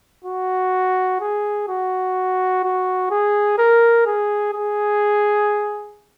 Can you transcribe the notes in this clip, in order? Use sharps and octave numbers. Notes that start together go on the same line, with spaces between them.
F#4
G#4
F#4
F#4
G#4
A#4
G#4
G#4